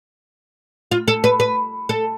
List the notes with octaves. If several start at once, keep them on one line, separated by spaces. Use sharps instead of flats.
F4
A4
B4
B4
A4